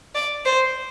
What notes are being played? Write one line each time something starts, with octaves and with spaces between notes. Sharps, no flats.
D5
C5